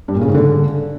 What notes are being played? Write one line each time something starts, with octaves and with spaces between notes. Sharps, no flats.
G2
A#2
C#3
G#2
D3